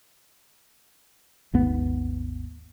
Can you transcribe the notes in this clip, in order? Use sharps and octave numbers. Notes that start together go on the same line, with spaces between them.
G#1 D#2 B3